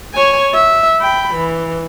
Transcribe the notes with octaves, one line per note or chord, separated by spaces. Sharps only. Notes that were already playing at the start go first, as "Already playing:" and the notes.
C#5 G#5
E5
G5 B5
E3